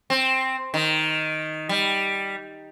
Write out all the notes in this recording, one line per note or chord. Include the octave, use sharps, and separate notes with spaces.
C4
D#3
G3